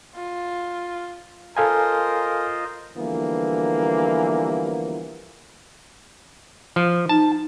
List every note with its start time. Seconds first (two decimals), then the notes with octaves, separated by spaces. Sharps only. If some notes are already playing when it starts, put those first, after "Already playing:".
0.16 F4
1.57 F4 A4 A#4 C5 D#5 F5 G#5
2.97 D3 E3 F3 G3 A#3 B3
6.76 F3
7.09 D#4 A5